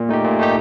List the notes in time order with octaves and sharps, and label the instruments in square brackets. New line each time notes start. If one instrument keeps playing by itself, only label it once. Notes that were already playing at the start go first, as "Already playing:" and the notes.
Already playing: [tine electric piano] A#2
A3 D#4 G4
A#2
A3 D#4 G4